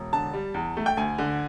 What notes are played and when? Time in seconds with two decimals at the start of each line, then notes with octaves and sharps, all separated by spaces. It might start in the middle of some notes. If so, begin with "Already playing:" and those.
Already playing: E1
0.13 D3 A5
0.33 G3
0.54 E2
0.77 A3
0.86 G5
0.97 D2 G#5
1.18 D3